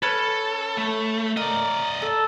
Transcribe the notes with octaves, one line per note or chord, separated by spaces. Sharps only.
C#4 A4 B4
A3
A#4 D5 D#5
A4